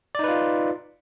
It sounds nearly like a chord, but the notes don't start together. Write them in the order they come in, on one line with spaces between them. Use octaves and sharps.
D5 D#4 B4 F4